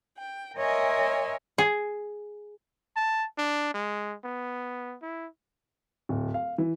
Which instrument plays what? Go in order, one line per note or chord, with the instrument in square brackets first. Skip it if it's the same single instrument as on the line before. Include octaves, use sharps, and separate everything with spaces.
[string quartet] G5
A#4 C#5 D#5 E5 G#5 C6
[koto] G#4
[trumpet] A5
D4
G#3
B3
E4
[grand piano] D1
F5
E3